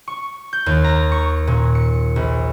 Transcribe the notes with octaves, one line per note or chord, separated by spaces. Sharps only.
C#6
G6
D#2
A#5
C#6
A#2
C#7
A#1